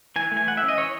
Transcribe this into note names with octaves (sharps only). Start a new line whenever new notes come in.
E3 G#5
A3
G#5
E3 F#5
E5
C#4
D#5
E3 C#5